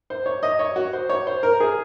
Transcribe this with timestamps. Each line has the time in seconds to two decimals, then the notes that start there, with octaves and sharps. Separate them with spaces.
0.10 C5
0.26 C#5
0.43 D#5
0.59 C#5
0.76 F#4
0.93 C5
1.10 C#5
1.27 C5
1.43 A#4
1.60 G#4